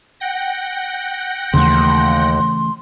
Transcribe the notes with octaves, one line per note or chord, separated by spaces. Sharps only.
F#5 G5 A#6
D#2 C#3 E3 A3 C6